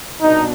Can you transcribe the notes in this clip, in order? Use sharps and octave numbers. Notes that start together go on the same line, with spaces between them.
C2 B2 B3 D4 D#4